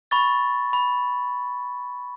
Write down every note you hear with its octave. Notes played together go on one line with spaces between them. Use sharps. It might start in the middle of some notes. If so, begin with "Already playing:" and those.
B5 C#6 A6
B5